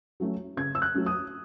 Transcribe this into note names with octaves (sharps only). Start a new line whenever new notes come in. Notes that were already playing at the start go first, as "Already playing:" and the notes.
F#3 A3 C#4
C#3 G#6
E6
F#6
F#3 A3 C#4
D#6